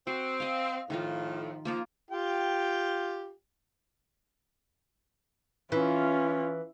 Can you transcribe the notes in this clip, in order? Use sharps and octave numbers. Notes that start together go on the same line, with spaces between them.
C4 F#4
D#5 F5
A2 D#3 F3 D#4 F4
F3 A#3 F4 A#4
F4 G4 G5
E3 C#4 F4